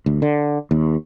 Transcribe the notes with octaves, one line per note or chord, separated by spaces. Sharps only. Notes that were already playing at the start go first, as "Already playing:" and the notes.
D2
D3
D#2